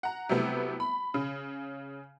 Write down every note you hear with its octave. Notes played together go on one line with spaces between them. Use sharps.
F#5 A#5
C3 F#3 G3 A3 B3 E4
B5
C#3